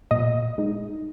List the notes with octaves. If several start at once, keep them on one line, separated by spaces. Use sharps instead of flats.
A#2 D#5
G#3 D#4